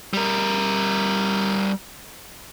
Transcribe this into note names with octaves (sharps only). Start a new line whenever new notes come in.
G3 A#4